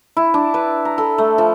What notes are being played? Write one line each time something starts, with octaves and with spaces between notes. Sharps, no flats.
E4
D4
B4
A#5
A4
A3
F3